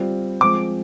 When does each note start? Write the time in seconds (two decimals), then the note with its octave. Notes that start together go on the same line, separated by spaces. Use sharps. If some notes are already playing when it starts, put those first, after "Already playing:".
Already playing: G3 C4 F4
0.41 F3 G#3 C4 D6